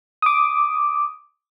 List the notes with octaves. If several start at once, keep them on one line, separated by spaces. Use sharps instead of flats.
D6 D#6